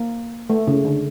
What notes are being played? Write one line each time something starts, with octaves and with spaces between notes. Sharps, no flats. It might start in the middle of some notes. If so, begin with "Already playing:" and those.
Already playing: A#3
A3
C#3
D3